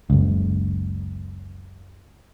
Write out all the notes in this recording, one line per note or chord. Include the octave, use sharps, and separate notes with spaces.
F#1 C#2